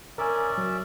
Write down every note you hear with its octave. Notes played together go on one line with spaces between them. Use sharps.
C#4 A#4 D5 E5 G#5
F#3